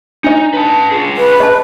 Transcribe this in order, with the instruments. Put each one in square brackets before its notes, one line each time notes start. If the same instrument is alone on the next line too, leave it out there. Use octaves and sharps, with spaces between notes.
[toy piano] D4 D#5 [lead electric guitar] D#4
[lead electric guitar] B4 A5
F4 G#4
[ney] B4
[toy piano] D#5 A5